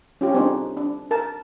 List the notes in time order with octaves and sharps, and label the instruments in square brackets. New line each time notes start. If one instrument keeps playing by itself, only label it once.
[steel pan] C#4 F4 G4
C4 D4 D#4
D4
A#4 A5